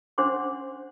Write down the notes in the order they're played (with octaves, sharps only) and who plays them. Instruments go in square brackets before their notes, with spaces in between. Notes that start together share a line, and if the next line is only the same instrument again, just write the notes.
[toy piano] C#4 D4 C5 F#5 C6 D6